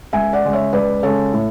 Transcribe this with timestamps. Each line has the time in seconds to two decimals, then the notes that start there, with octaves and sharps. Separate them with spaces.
0.13 C#2 E5 G#5
0.33 D5 F#5
0.44 C#3 G#3
0.53 C#5 E5
0.73 C#2 B4 D5
1.03 C#3 G#3 A4 C#5
1.33 A2